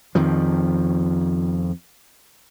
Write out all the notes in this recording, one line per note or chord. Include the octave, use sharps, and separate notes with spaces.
F2 D#3 F3